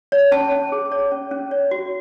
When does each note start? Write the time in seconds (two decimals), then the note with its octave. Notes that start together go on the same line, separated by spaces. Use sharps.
0.12 C#5
0.32 C#4 A5
0.52 C#4
0.72 G#4
0.92 C#5
1.12 C#4
1.31 C#4
1.51 C#5
1.71 F#4